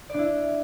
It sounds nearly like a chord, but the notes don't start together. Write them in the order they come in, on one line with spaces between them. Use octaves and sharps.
D5 D4 E4